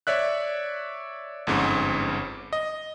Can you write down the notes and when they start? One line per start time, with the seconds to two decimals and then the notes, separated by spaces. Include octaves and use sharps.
0.07 C#5 D5 E5 F#6
1.47 G1 F2 G#2 C#4
2.53 D#5